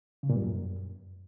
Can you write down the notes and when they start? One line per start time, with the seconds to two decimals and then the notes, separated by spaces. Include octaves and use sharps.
0.23 C#3
0.30 A#2
0.36 G2
0.42 F#2